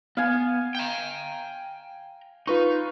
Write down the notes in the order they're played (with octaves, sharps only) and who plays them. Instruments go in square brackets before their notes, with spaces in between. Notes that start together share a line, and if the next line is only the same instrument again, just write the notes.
[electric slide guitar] B3 [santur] F5 G#5
[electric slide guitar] G5 A#5
[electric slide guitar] D#4 [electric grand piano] F4 B4 C#6